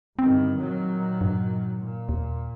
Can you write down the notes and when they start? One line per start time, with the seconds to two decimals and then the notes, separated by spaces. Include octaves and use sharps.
0.19 G1 G2 D#3 C4
0.58 A#2 D#3 F#3
1.21 G2
1.77 A#2
2.09 D#2